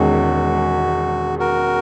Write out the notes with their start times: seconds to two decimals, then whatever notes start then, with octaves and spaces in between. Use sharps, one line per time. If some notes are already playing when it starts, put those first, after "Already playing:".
Already playing: E1 E2 D#3 G#3 C#4 F#4
1.39 F#4 A#4